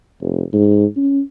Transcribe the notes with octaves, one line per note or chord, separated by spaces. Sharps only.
F1
G#2
C#4